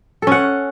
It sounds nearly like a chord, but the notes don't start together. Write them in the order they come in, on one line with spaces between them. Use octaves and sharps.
A4 C#4 F#5